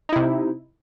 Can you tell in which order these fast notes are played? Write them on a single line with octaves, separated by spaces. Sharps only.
D#4 E4 C3